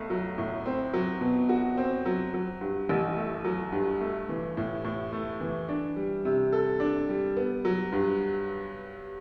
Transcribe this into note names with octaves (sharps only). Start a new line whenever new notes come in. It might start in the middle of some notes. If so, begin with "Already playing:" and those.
Already playing: B1 A3
F#3
A2
C4
F#3
B2
F#4
C4
F#3
F#3
G2
A1
A3
F#3
G2
A3
E3
A2
A2
A3
E3
D4
G3
C3
A4
D4
G3
B3
F#3
G2